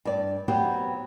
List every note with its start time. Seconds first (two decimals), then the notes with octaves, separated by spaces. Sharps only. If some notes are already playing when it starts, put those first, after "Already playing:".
0.05 G2 D5
0.48 F#3 B3 C4 G4